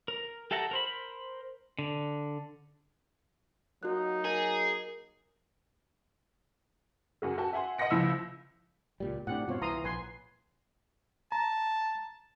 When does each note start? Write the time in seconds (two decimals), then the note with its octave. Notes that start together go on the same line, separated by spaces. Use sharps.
0.08 A#4
0.51 G4 A4 E5 F#5 A#5
0.71 A#4 C5 B5
1.79 D3
3.83 F#3 A#3 D#4 F#4 F#6
4.25 G#4 A#4 A#5
7.22 F#2 F#4 G#4
7.38 F#4 G5 A5
7.53 E5 F#5 G#5 C6
7.78 D#5 F#5 C6 A#6 C#7
7.90 C#2 F3 E4 E5 E6
9.00 C#2 A#2 G3
9.27 A2 C3 D4 G4 F#5
9.48 G2 B2 C4 F4 C#5
9.62 C2 E3 A#5 C6 D#6
9.84 A#1 B4 G#5 C6
11.32 A5 A#5